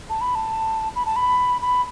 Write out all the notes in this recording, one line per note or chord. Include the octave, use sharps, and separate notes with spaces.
A5
B5
A5
B5
A5
B5
B5